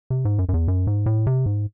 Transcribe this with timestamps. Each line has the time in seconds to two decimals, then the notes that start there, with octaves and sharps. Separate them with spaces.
0.10 C3
0.25 G#2
0.39 F#2
0.49 F#2
0.54 E2
0.68 F#2
0.87 G#2
1.06 A2
1.27 C3
1.46 G#2